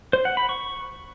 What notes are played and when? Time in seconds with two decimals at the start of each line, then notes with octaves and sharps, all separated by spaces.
0.13 C5
0.25 F#5
0.37 B5
0.49 C#6